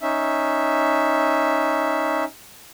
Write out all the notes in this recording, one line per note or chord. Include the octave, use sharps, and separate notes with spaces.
C#4 D#4 E5